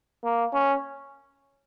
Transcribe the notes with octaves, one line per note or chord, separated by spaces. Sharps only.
A#3
C#4